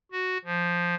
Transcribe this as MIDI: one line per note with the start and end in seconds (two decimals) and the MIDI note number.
0.12 0.38 66
0.45 0.95 53